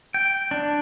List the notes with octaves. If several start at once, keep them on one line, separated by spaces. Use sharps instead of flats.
G5
D4